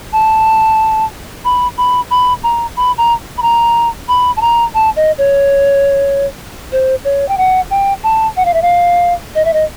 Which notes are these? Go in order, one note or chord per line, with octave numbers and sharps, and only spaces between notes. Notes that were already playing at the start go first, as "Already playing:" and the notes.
A5
B5
B5
B5
A#5
B5
A#5
B5
A#5
B5
A5
A#5
A5
D#5
C#5
C5
C#5
G5
F#5
G5
A5
F#5
F5
E5
F5
D#5
E5
D#5